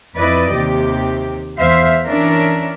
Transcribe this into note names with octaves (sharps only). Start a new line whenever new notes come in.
F2 E4 B4 D5 D#5
D#2 C3 G4
E2 C5 E5 F5
E3 C#4 D4 A#4 E5